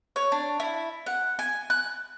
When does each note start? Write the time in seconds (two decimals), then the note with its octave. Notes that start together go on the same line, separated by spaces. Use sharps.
0.16 C#5
0.32 D4
0.60 E4
1.06 F#5
1.39 G#5
1.70 F#6